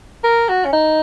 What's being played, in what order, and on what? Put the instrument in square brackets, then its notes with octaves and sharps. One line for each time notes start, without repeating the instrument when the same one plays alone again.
[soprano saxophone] A#4
F#4
C#4
D#4